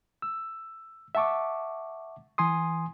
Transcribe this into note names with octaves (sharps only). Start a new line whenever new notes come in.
E6
E5 F#5 A5 C#6 D6
E3 G#5 C6 D#6